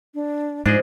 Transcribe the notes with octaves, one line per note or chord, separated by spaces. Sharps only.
D4
G#2 F3 D4 G#4 D#5